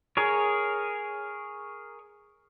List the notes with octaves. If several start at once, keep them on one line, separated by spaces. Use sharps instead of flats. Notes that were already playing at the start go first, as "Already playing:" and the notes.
G#4 A#4 C#5